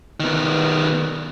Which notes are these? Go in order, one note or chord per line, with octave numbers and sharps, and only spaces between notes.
D#3 B3